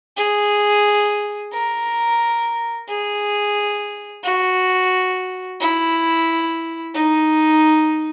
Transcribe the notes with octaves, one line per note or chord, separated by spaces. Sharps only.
G#4
A#4
G#4
F#4
E4
D#4